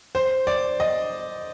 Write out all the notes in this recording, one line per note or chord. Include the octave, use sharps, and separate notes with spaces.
C5
D5
D#5